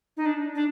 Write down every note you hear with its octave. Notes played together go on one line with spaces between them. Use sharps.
D#4
D4
D4